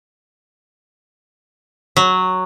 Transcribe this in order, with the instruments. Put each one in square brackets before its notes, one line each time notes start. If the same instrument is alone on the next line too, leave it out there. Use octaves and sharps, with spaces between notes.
[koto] F#3